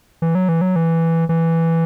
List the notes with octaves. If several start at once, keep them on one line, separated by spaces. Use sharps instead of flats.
E3
F#3
E3
F#3
E3
E3